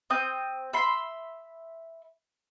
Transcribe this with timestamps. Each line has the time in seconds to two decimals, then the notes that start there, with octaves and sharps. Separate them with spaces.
0.10 C4 D#6 G6
0.73 E5 B5 C6